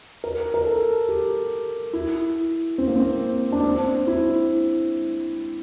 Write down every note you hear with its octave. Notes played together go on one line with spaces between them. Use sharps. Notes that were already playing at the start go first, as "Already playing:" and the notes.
A#4
A#4
A4
G4
E4
C4
A#3
C4
D4
C4
E4